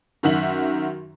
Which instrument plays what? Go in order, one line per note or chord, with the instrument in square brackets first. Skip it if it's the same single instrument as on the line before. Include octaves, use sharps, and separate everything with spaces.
[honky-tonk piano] F#2 D#3 F#4 E5 F#7